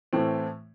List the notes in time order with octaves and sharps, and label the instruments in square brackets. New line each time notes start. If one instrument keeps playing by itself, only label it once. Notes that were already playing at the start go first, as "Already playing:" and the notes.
[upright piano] A2 E3 A3 C4